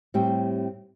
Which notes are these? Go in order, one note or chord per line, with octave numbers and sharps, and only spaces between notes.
A2 G3 C4 G4 G5